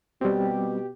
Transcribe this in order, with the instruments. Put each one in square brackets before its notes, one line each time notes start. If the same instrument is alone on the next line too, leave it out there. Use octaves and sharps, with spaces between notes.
[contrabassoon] B2 [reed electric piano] G3 C4 [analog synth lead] G4